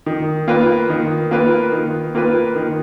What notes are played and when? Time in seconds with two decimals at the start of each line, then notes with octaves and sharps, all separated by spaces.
0.06 D#3
0.48 A#3 F4 B4
0.89 D#3
1.31 A#3 F4 B4
1.72 D#3
2.15 A#3 F4 B4
2.56 D#3